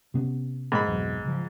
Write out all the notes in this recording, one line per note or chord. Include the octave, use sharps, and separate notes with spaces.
C3 B3 C#4
G#2 B5
B1 F2 E3
C#3 F3